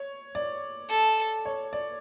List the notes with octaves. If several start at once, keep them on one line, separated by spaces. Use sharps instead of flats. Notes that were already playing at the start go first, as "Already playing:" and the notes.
Already playing: C#5
D5
A4
C#5
D5